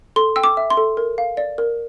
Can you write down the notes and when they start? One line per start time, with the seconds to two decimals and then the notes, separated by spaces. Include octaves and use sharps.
0.16 A4 C6
0.36 G5 E6
0.44 D6
0.57 E5
0.70 C6
0.77 A4
0.97 A#4
1.18 F5
1.37 D5
1.58 A#4